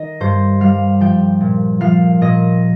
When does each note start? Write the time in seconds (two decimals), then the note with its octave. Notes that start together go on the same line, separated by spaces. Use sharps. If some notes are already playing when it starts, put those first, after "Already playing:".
Already playing: D#3 D#5
0.20 G2 C5
0.61 G3 F5
1.01 F3 G5
1.41 A#2
1.81 F3 F5
2.21 A#2 D#5